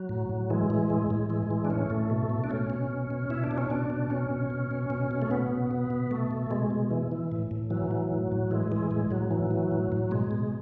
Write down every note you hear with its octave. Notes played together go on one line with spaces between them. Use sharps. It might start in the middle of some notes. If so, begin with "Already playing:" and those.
Already playing: F#3
A2
A2
E3 G#3
E3
A2
A2
E3 G#3
E3
D4
A2 C#4
A2 A3
B2
B2
D4
B2 C#4
B2
B2
B2
B2 E4
D4
B2
C#4
B2 D4
B2
B2 C#4
B2
B2
B2
B2
B2
A3
B2 B3
B2
B2
B2
B2 A3
B2
B2 G#3
B2
E3
E3
A2
A2
E3 F#3
E3
A2
A2
E3 G#3
E3
A2 G#3
A2 F#3
E3 F#3
E3
A2
A2
B2 G#3
B2